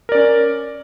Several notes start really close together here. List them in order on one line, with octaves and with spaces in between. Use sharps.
A#4 D5 C#4